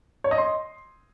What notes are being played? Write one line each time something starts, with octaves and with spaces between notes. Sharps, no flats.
C#5
D#5
C6